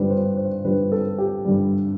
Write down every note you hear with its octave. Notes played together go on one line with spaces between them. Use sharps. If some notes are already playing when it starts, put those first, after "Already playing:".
Already playing: G2 D3 G3 B4 C5 D5
C5
C5
G2 D3 G3 B4
A4
G4
G2 D3 G3